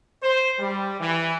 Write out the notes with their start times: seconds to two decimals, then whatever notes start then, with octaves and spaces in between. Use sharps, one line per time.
0.23 C5
0.60 G3
1.00 E3